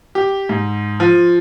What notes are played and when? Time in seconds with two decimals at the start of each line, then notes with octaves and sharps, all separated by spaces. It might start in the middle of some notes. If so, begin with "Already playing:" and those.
0.15 G4
0.49 G#2
1.00 F3